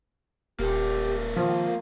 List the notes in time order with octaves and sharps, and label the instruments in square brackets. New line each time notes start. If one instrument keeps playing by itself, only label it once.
[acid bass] D#1 [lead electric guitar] A#3 A4 [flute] G4
[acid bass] D#3 [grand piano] F3 [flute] F5